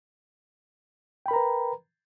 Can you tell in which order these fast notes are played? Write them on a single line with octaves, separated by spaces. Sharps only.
G5 B5 A#4 A#5 B4